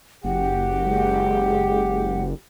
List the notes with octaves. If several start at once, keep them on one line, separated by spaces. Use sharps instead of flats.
F#1 G4 F#5
G#3